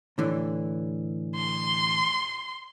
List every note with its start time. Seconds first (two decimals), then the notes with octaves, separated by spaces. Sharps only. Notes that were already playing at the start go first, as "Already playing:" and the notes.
0.18 A2 D3 E3
1.36 C6